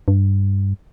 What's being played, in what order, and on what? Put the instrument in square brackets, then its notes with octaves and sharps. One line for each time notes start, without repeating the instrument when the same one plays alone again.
[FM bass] G2